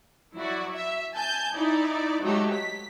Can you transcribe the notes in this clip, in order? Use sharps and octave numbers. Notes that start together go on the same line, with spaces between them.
F#3 E4 F#4 D5
E5
G#5 A5 G6
D#4 E4 D5
F#3 G#3 A3 D#4 G4
B6